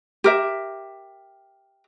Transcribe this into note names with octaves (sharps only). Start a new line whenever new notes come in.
G4 A#4 E5